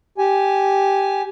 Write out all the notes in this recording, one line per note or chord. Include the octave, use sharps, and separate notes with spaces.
G4 G#5